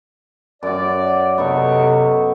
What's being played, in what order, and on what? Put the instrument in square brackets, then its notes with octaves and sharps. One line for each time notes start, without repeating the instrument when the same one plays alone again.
[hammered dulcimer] F#2 F#4 [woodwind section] D5
[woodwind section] C3 C#6 [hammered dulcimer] B3 D#4 A4